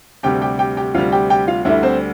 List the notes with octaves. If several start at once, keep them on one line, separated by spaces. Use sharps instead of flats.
D2 C3 G3 G4 G5
G4 G5
G4 G5
G4 G5
D2 C3 G3 F4 F5
G4 G5
G4 G5
F4 F5
D2 D3 G3 E4 E5
C4 C5